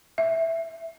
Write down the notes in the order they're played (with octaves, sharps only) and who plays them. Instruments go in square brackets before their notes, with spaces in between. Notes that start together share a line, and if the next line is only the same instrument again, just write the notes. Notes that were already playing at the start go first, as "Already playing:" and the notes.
[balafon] E5